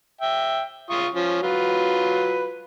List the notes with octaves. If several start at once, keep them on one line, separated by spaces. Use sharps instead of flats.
E5 G5
F4 C#6 D#6
F3 C#4
F#3 F4 B4